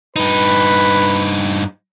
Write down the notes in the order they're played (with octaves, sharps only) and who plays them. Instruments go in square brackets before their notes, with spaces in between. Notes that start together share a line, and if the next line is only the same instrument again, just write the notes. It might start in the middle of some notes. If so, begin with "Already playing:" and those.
[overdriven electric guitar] G2 D#4 [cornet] B4